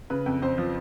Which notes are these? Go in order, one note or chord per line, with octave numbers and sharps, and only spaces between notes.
C#3 B4
F2
F2 C5
F3